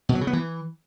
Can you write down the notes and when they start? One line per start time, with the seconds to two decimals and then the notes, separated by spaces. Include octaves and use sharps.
0.09 B2
0.15 F#3
0.21 C#3
0.27 B3
0.33 E3